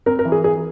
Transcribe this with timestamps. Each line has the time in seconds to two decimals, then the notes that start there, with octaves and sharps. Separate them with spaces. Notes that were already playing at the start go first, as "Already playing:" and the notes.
0.06 C4 A#4
0.19 A#4
0.25 E3
0.32 G#4
0.44 E3 G#4